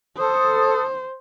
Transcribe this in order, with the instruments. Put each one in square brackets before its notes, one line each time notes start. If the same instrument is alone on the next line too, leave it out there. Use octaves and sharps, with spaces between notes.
[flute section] A4 D#6 [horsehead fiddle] C5